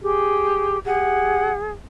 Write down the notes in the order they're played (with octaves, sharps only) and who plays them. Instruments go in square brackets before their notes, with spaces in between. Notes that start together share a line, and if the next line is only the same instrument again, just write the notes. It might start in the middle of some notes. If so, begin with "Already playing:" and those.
[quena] G4 [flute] G#4
[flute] G4 [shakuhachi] G#4 [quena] F#5